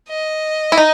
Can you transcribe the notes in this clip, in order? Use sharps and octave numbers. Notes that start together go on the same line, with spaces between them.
D#5
E4
D#4